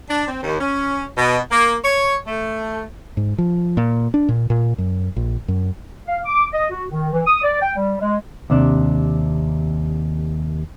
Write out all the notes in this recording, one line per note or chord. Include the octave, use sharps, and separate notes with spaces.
D4
C4
D#2
C#4
B2
A#3
C#5
A3
G#2
F3
A#2
D4
A#2
A#2
F#2
A#1
F#2
F5
D6
D#5
F#4
D#3
E3
D#6
D5
G5
G3
G#3
D#2 C3 D4